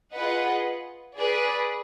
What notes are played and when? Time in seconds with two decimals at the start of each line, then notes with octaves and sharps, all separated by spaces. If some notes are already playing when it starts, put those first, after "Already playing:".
0.12 F4 G#4 B4 D#5 F#5
1.18 G#4 B4 D5